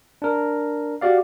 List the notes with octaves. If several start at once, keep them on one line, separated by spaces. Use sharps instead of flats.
D4 A#4
F#4 G4 D5 F5